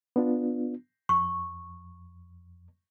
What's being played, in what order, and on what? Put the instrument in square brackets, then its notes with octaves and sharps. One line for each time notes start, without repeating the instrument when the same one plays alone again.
[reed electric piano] B3 D4 F4
[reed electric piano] F2 [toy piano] C#6